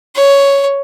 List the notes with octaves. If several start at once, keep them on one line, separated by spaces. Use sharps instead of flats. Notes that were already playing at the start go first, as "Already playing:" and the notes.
C#5